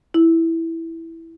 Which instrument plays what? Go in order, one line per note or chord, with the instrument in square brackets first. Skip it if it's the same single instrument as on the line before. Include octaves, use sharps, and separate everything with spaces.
[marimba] E4